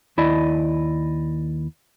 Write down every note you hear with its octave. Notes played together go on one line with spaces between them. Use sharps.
D#2 E4 D5 D#5